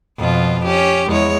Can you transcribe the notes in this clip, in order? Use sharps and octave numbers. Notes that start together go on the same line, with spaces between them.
F2 B2 F4
C#4 G4
E2 G#3 C#5